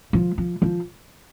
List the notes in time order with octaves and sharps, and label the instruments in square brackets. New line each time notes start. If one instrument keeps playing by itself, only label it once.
[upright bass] F3
F3
F3